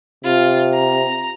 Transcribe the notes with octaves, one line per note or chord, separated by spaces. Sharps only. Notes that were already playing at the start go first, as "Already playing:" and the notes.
C3 F4
A#5